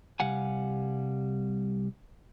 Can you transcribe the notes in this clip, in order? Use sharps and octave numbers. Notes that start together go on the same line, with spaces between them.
C2 C3 G3 F5 F#5 G#5